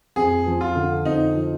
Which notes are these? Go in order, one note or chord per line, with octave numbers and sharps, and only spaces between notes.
F2 G#4
F3
F4
D3
C4 D#4
F3